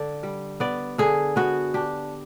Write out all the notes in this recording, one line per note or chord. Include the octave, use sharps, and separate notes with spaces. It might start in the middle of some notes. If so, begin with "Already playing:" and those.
Already playing: D3 D5
G3
B3 D5
D3 G#4
B3 F#4
D4 G4